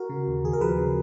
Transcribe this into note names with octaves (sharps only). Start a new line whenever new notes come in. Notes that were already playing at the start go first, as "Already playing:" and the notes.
Already playing: F#4 A#4
C#3
D#2
D#2 G#4
A#4
F3 G#4 B4
C#3